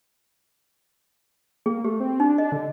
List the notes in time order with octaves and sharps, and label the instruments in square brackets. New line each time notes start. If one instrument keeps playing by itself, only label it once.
[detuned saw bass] A#3 [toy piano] G#4
[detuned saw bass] A3 [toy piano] G4
[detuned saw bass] C4
[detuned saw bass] D4 [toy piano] D#4
[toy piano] D#5
[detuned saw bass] D3